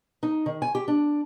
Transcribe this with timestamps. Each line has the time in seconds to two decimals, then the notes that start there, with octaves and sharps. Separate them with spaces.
0.23 D#4
0.46 D#3
0.62 G#5
0.75 G4
0.88 D4